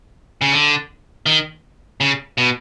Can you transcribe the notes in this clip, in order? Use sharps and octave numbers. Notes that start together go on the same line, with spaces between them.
C#3
D3
D#3
C#3
B2